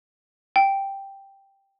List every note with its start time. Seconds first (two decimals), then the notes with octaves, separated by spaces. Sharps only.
0.56 G5